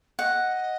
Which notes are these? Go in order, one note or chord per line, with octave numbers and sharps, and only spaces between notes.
D#5 F#5